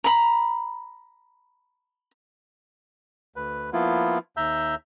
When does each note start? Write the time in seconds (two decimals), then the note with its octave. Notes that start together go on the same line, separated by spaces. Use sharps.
0.04 A#5 B5
3.36 D2 B4
3.73 F3 A#3 B3 E4 F4
4.37 D#2 E5 A#5 E6 G6